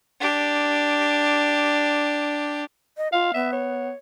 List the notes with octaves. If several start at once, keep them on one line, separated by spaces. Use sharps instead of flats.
D4 G4
D#5
F4 F5
B3 E5
C#5